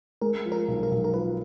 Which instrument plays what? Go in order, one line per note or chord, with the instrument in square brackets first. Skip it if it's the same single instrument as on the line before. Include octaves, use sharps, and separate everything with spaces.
[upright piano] G#3 [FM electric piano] A#4
[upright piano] F3
[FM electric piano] A#4
[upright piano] B1
[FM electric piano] A#4
[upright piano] B1
[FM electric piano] A#4
[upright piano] F3 [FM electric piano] B4